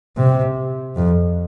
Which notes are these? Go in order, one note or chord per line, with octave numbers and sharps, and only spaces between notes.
C3
F2